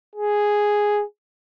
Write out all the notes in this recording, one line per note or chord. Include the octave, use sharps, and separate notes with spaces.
G#4